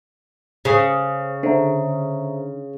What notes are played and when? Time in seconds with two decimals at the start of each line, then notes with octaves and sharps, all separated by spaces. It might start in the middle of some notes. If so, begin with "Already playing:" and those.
0.65 C#3 C5 G#5
1.43 D3 C5 E5 A#5